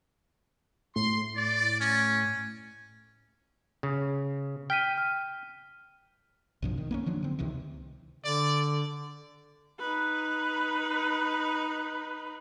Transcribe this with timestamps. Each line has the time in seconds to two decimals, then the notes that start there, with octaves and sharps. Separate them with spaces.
0.96 A2 C6
1.36 D5
1.79 C#4
3.83 C#3
4.70 G5 F6 B6 D#7
4.98 F6
6.62 B1 G2 F3
6.78 D#3
6.91 A#3 B3 C#4
7.06 D#3 F3 F#3 D4
7.23 D3 C4
7.39 C#2 C3 D#3 E3
8.24 D3 D5
9.79 D#4 B4